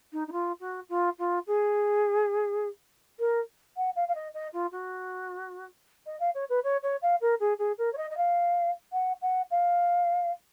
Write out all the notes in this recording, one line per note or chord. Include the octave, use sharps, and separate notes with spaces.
D#4
D#4
F4
F#4
F4
F4
G#4
A#4
F#5
F5
F5
D#5
D#5
F4
F#4
D#5
F5
C#5
B4
C#5
C#5
F5
A#4
G#4
G#4
A#4
C#5
D#5
D#5
F5
F#5
F#5
F5